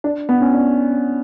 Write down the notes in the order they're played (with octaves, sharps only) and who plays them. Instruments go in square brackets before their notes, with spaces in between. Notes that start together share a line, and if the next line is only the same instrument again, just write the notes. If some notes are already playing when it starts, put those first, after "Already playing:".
[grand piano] D4
B3
C#4
D4